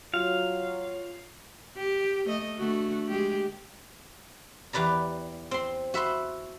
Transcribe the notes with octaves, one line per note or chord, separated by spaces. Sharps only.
F#3 F4 C#5 F5
G4
A3 D#5
D3 A3 F#4
G#3 G4
E2 G4 B4 D5 A#5
C4 C6
F#4 E5 B5 C6